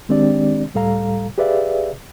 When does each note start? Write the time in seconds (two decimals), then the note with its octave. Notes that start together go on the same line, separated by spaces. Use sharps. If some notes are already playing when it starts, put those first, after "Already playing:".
0.09 D#3 G#3 C4 D4 G4 D5
0.74 C#2 A2 G3 A4 F5 A#5
1.38 G4 G#4 B4 D5 E5 F5